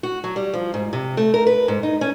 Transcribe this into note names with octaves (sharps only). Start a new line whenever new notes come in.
F#4
F#3
G3
F3
G#2
C3
A3
A#4
B4
G#2
D#4
C#4